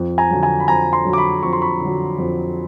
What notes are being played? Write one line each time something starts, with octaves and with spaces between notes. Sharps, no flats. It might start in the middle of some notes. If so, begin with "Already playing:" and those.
Already playing: F2
G#5 A#5
D3 F#3
G#5 A#5
B5
F2 G#5 A#5
A#5 C6
D3 F#3
D6
B5 C#6
F2 C#6
C6
B5 C#6
D3 F#3
F2